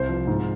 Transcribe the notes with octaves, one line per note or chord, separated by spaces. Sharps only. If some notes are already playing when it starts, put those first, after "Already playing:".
Already playing: C2 C5
F3
G#2